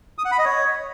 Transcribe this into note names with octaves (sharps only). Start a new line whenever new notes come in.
D#6
F#5
B5
D#5
C#5